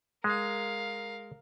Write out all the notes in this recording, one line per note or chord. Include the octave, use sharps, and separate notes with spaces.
G#3 A#4 F5